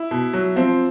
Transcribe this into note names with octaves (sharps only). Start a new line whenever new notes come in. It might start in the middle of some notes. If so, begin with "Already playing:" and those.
Already playing: E4
B2
F#3
F3 C4